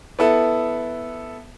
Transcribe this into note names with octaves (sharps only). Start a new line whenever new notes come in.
B3 E4 A4